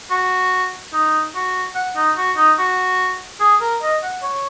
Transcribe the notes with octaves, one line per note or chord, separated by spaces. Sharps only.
F#4
D#4
F#4
F#5
D#4
F#4
D#4
F#4
G#4
A#4
D#5
F#5
C#5